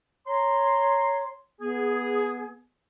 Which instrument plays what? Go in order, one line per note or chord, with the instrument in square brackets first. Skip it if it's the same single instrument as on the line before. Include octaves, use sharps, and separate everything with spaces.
[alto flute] C#5 [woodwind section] A#5 C6
[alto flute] B3 [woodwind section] G#4